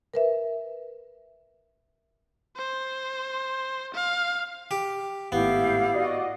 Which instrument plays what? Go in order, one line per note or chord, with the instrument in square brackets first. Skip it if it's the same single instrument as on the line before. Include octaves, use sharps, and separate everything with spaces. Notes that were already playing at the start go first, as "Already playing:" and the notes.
[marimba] A#4 B4 E5
[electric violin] C5
F5
[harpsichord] G4
[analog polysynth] G#1 A2 [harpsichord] B3 [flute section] E4 G4 F5
[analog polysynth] F#4 D5 D#5